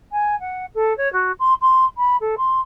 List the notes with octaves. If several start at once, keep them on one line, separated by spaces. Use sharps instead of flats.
G#5
F#5
A4
C#5
F#4
C6
C6
B5
A4
C6